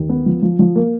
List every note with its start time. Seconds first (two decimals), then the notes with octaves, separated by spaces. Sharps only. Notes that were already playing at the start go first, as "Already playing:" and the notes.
Already playing: D#2
0.09 B3
0.26 F3
0.42 F3
0.59 F3
0.76 A#3